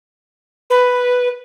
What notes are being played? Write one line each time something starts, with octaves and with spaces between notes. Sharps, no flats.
B4